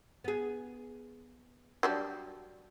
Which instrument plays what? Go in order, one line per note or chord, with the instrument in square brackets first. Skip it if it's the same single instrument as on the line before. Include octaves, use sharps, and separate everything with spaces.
[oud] B3 G#4
[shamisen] F#3 G3 D4